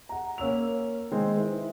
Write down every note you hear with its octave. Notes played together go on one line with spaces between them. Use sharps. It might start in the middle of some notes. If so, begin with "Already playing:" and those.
F#5 A#5
A#3 C#4 E6 F7
D#3 G#3 C4
E4 B4